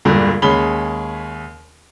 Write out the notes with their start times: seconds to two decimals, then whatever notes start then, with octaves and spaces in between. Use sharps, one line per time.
0.05 E1 G2 A#2 D3
0.42 D#2 G#3 C#4 G#4 B5 G7